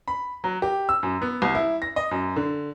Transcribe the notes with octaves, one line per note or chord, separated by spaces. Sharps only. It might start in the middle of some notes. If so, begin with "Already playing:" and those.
B5
F#3
G4
E6
F#2
B3
C2
E4
A#6
D#5
F#2
D3